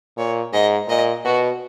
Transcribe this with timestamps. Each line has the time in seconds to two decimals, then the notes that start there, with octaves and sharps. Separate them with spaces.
0.17 A#2 C#5
0.53 G#2 D#5
0.88 A#2 D#5
1.25 B2 F#4